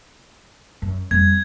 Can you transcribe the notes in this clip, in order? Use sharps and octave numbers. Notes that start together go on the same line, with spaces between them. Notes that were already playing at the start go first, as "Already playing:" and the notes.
F#2
F2 G3 G#6